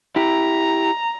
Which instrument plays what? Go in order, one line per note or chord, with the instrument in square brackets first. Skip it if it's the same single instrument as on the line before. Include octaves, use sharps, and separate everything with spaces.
[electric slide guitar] E4 G4 [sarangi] A#5